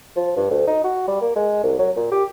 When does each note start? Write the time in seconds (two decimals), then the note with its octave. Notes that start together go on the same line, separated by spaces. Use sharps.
0.16 F3
0.37 G2
0.50 D2
0.67 D#4
0.84 F#4
1.08 G3
1.21 A#3
1.36 G#3
1.63 C2
1.79 F#3
1.96 A#2
2.12 G4